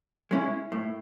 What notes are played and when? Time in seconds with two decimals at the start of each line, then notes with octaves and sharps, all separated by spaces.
0.31 G#3 C#4 E4
0.72 A2